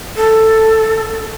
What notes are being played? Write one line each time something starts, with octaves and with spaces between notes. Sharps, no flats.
A4